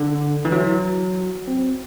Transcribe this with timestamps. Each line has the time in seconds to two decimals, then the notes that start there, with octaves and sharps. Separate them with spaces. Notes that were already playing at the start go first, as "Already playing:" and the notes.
Already playing: D3
0.45 E3
0.52 F#3
1.48 C4